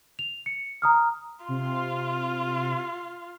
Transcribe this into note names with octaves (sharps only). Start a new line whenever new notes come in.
F7
C#7
A#5 D#6 F6
C3 F4 C6